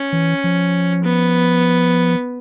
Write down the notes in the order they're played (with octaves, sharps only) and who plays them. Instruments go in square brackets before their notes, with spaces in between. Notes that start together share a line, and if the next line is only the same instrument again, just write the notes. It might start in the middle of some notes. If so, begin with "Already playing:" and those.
Already playing: [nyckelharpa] C#4
[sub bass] E3
F3
[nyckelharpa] B3